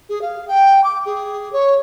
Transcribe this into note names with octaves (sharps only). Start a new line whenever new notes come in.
G#4
F5
G5
D6
G#4
C#5